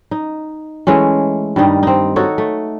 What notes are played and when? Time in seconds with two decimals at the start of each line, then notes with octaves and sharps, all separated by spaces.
0.11 D#4
0.87 E3 G#3 A3 C#4
1.56 G2 D#3 G3 D#4
1.83 C4 D#4
2.16 D#4 F#4 A4 C#5
2.38 A3